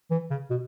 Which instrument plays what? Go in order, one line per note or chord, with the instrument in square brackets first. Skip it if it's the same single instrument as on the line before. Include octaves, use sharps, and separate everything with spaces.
[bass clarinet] E3
C#3
B2